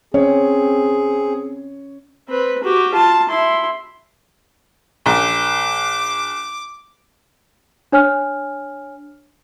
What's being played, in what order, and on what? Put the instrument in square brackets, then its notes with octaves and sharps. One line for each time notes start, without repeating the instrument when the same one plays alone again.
[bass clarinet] C4 [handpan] C#4 [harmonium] G#4 [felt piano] C#5
[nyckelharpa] C4 B4
F#4 G4
F4 A5
E4 C6
[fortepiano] A#1 [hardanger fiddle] D6
[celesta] D4 C#5 G#5 F6